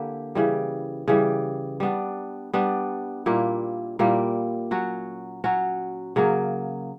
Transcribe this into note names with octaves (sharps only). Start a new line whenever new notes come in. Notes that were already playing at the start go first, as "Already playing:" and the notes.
Already playing: D3 A#3 E4 G4
C#3 E3 G3
C#3 E3 G3
G3 B3 D4
G3 B3 D4
A#2 G3 A#3 E4
A#2 G3 A#3 E4
F#3 C#4 F#4
F#3 C#4 F#4
C#3 F#3 A#3